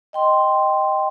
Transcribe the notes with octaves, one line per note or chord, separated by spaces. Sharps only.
D#5 G5 C6